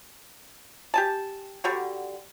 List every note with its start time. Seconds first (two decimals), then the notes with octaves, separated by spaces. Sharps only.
0.94 G4 G#5 A5
1.64 D3 G3 F#4